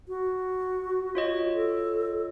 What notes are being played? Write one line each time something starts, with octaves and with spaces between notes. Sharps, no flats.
F#4
F4 C#5 D#5
A4